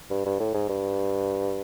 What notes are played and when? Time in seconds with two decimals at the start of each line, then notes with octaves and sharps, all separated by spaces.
0.10 G2
0.26 G2
0.40 A2
0.54 G#2
0.69 G2